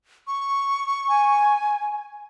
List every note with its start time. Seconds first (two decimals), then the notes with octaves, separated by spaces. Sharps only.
0.27 C#6
1.08 G#5